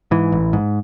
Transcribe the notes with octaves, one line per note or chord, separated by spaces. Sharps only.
G#2 E3
A1
G#2